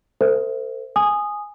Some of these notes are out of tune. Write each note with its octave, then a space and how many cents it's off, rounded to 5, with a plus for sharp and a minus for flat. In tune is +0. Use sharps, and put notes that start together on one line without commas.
A4 +45 C5 -25 E5 +0
G#5 +0 D#6 -10